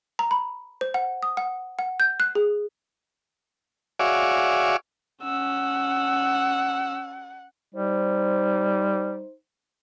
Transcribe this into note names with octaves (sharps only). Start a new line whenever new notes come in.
A#5
B5
C5
F#5
D#6
F#5
F#5
G6
F#6
G#4
F#4 G#4 C#5 D5 E5 F5
C#4 F#5 E6
G3 D#4 C5